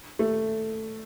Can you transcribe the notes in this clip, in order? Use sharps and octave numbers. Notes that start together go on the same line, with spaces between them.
A3